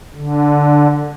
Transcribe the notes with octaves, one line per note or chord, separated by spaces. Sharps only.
D3